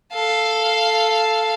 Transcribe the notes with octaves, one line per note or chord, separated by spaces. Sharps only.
A4 F5